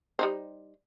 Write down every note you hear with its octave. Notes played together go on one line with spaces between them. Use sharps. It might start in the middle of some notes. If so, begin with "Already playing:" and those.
G3 D#4 C5